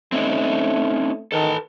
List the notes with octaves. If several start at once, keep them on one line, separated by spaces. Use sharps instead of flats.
A3 C4 C#4 D#4
D#3 A4 B4 A5